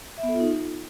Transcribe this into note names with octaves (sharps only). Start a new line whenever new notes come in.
E5
B3
A4
F4
D#4